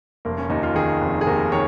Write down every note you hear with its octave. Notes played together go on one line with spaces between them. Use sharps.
F1 A#3
C#4
D#2 D#4
F4
D#3 G#4
F1
G#4
D#2 A#4
D#3 C#5